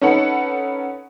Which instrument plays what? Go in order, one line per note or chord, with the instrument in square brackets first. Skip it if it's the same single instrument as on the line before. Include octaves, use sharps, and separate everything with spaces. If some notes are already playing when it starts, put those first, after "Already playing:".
[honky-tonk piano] C#4 D#4 A4 B4 F#5